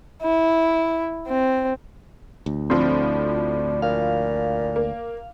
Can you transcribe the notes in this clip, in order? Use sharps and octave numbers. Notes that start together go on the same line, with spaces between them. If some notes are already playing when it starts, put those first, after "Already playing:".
E4
C4
D2
A2 F3 C4 D4
A#2 F5
A#3